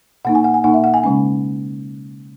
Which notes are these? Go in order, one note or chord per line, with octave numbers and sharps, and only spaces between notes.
B2 A#3 D#4 F#5
G#5
F#5
G#5
B2 A#3 D#4 F#5
E5
F#5
G#5
C#3 G#3 C#4